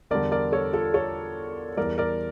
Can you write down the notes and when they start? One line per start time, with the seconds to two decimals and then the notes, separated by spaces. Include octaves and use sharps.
0.10 E2 D3 G3 A#4 D5
0.32 A#4 D5
0.52 A4 C#5
0.73 F4 A4
0.94 A4 C#5
1.77 E2 E3 G3 A#4 D5
1.98 A#4 D5